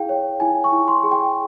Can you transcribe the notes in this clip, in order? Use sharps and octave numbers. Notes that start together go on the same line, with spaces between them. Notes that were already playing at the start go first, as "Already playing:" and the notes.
Already playing: E4 G#4 F5 G5
C#5
E4 G#5
C#6
E4
C6
G#4
G5